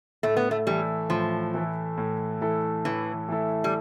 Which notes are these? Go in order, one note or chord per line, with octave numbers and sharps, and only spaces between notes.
A2 A3
B3
A3
E3 G3 A3 E4 A4
A2 F3
E3 A3 E4 A4
A2
E3 A3 E4 A4
A2 E3
E3 A3 E4 A4
G3